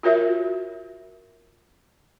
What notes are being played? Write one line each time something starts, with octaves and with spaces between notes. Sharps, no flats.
F4 F#4 A#4 C#5 E5